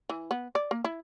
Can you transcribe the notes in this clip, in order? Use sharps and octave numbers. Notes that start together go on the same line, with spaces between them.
E3
B3
D5
A#3
E4